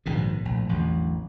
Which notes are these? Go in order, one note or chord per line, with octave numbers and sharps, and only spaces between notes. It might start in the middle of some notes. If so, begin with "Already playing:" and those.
A#1 G#2 B2 D#3
A#1 A2
A1 E2 D3 F#3